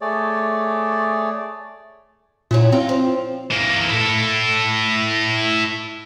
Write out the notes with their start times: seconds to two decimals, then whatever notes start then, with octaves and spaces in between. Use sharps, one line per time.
0.01 A3 G#4 C#5 D5
2.51 A#2 F#3 C#4 E4
2.72 C4 D#4 F4
2.89 F3
3.51 E3 A#3
3.89 E4 A4